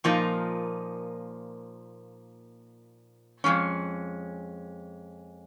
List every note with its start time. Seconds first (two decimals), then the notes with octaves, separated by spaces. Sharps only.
0.04 A#2 F3 A#3 D#4
3.44 F2 C#3 G#3 C#4